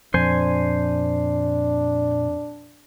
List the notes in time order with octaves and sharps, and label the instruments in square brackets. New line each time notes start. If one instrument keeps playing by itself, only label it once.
[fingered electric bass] F2 [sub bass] A#2 [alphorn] D4 [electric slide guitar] C5 G#5